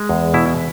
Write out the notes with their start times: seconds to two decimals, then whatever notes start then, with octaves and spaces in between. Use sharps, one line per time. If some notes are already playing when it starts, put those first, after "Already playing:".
Already playing: G#3
0.09 E2
0.34 B2 E4